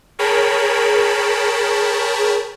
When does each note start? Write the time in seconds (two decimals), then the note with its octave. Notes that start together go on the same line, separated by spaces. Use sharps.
0.19 G#4 A#4 C#5 G5 A5 B5